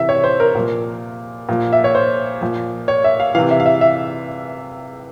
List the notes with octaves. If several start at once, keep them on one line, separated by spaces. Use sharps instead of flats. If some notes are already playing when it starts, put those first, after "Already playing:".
Already playing: C3 E3 E5
C#5
C5
A#4
A#2 F3
A#2 F3
E5
C#5
C5
A#2 F3
C#5
E5
F5
C3 E3 F5
E5
F5
E5
E5